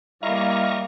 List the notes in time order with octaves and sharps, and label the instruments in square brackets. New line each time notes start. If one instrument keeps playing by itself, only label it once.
[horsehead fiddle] G3 A#3 [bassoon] E4 [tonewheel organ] D#5 A#5 C#6 [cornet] F5